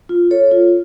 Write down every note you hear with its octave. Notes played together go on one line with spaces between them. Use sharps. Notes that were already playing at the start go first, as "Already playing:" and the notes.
F4
A4 C#5
F4